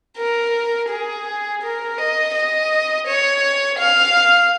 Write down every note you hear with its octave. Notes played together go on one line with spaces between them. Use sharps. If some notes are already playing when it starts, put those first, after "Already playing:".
A#4
G#4
A#4
D#5
D#5
C#5
F5